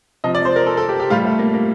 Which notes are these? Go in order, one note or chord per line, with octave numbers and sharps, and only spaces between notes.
C3 F3 D#5
D5
C5
A#4
A4
A4
G4
G4
A2 G3 F4
A3
A#3
A#3